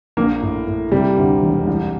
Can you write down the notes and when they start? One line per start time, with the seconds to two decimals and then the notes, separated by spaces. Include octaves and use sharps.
0.17 A#1 A#3
0.42 A2
0.67 A2
0.92 C3 G3
1.18 D2
1.42 E1
1.67 C2